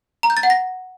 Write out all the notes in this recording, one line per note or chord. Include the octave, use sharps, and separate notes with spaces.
A#5
G6
A6
F#5
A#6